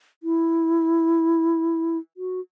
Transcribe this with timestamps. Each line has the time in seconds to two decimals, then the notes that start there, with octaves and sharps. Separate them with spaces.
0.23 E4
2.17 F#4